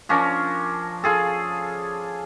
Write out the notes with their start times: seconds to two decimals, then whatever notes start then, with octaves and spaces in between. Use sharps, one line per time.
0.09 F3 C#4 D4 A#4
1.04 F4 G#4 A4